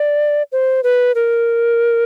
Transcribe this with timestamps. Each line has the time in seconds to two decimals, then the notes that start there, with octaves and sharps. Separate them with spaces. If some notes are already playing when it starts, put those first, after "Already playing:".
Already playing: D5
0.52 C5
0.83 B4
1.15 A#4